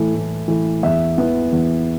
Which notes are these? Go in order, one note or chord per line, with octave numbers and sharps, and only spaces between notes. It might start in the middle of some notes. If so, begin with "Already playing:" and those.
Already playing: A2 E3 A3
A2
E3 A3
E2 E5
E3 B3
E2